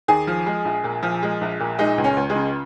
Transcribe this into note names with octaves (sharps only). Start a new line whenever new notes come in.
D#2 G#4
F3
G#3
A#1
A#2
F3
G#3
A#1
A#2
G#3 D#4
C#2
C#4
C#2
G#3
C#3